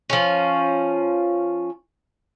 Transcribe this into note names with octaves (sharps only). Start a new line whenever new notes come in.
F3 C#4